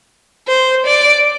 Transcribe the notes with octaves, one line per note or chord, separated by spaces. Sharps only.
C5
D5